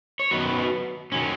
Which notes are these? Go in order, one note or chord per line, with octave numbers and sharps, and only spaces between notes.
C#5
F#2 D#3 F#3 B3 F#4 B4
D#3 F#3 C#4